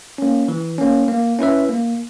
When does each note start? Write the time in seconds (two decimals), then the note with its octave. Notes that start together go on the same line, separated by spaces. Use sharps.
0.18 A#3 C#4
0.48 E3
0.78 A#3 C#4
1.08 A#3
1.39 C#4 E4 B4 E5
1.69 A#3